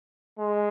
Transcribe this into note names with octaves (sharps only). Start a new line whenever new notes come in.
G#3